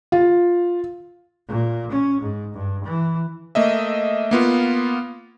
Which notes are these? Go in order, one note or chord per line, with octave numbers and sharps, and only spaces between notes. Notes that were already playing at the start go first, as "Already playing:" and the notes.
F4
A#2
C#4
G#2
G2
E3
A3 A#3 D#5 E5
A#3 B3 F4